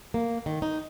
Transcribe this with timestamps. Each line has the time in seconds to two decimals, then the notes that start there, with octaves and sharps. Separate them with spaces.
0.14 A#3
0.46 D#3
0.62 D#4